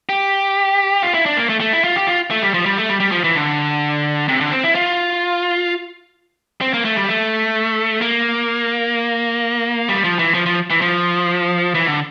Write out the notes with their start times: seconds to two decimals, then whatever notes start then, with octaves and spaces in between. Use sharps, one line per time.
0.09 G4
1.02 F4
1.14 E4
1.26 D4
1.37 A#3
1.49 A3
1.60 A3
1.73 E4
1.84 F4
1.96 G4
2.07 F4
2.31 A3
2.42 G3
2.54 F3
2.66 G3
2.77 A3
2.89 G3
3.00 G3
3.12 F3
3.24 E3
3.35 D3
4.28 C3
4.41 D3
4.52 C4
4.63 E4
4.75 F4
6.61 C4
6.74 A#3
6.85 A3
6.96 G3
7.08 A3
8.01 A#3
9.89 G3
10.04 F3
10.19 E3
10.34 F3
10.46 F3
10.70 E3
10.81 F3
11.75 E3
11.86 D3